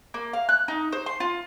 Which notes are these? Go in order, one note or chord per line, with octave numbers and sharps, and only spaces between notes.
A#3
F5
F#6
D#4
C5
C6
F4